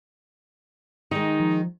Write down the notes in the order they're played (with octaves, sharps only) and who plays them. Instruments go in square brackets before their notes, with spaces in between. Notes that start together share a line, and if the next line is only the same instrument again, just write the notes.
[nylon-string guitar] D#3 G#3 [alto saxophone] D#4
[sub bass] F3